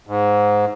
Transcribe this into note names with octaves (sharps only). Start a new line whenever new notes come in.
G#2